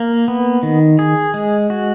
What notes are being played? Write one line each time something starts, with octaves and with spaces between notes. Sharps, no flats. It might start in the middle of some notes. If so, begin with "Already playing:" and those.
Already playing: A#3
B3
D#3
G#4
G#3
F#4